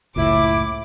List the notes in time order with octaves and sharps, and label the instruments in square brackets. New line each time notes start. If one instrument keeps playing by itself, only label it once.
[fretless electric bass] F#1 C#2 A2 [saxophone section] E4 [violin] D6